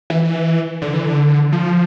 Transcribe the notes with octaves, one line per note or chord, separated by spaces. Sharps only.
E3
D3
E3
D3
F3